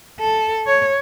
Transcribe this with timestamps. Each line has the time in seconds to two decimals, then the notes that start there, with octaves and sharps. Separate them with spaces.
0.20 A4
0.67 C#5